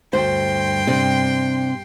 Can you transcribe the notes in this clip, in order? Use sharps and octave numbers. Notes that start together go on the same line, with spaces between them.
D2 G2 C5 G5 C6
C3 D4 C5